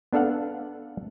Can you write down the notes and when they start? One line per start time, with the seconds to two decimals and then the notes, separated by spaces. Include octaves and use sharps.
0.13 B3 D4 A4 F5 F#5